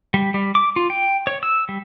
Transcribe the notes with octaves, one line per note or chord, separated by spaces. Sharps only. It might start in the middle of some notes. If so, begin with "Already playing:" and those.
G3
G3
D6
F4
G5
C#5
E6
G3